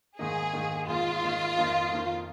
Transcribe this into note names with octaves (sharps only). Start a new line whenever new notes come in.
G#2 D#3 A#3 D#4 G#4
G#2 D#3 A#3 D#4
G#2 D#3 A#3 D#4 F4
G#2 D#3 A#3 D#4
F2 D#3 A#3 D#4
F2 D#3 A#3 D#4